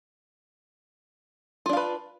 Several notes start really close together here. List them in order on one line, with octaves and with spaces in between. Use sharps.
F4 D4 F5 B4